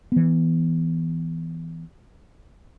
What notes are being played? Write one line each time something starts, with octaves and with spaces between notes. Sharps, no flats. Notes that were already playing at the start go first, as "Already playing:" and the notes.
E3 B3